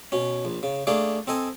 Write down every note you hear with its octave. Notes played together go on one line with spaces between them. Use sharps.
B2 C#4
A#1
C#3
A3 A#3 D4 G#4 D5
C4 A4 D#5 G#5